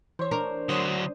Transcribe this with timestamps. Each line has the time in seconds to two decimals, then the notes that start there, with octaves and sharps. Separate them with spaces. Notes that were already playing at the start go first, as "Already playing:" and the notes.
0.19 E3 C5 C#5
0.31 D4 A#4
0.69 D3 F#3 C#5 C6 D#6